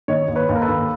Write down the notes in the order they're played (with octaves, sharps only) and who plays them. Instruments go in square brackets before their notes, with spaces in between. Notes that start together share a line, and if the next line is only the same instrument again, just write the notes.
[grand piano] D#3 C#5 D#5
D#2
B4 C#5
D#2
A#4
A4 B4
D#2